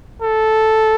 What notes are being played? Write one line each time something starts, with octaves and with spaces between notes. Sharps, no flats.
A4